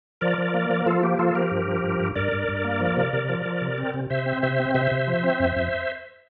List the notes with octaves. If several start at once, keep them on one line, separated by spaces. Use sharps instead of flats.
F3 A#4 D5
F3
A#3
F3
A#4
F3 F4 A4
A#3 G4
F3 F4 A4
F3 G4 A#4
G2
F3
G2
G2
G2 A#4 D5
G2
G2
A#3
F3
C3
C3
F3
F3
C3
C4
C3
C3 C5 E5
C4
C3 C5 E5
C4
C3 C5 E5
C3
F3
C4
F2
F2